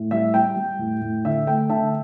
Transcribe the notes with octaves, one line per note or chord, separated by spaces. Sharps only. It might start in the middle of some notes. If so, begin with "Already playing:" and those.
Already playing: A2
G3 E5
G3 G5
G3
A2
A2
D3 E5
A3 G5
D3 E5 A5